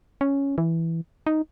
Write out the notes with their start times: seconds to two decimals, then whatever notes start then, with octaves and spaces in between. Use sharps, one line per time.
0.21 C#4
0.58 E3
1.27 D#4